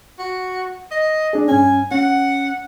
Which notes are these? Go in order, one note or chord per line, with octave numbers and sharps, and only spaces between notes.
F#4
D#5
D4 G#4
G2 C#4 G#5
C#4 F#5